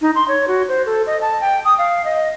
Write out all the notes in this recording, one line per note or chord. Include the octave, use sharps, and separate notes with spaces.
D#4
C6
C#5
F#4
C5
A4
D#5
A5
G5
D#6
F5
D#5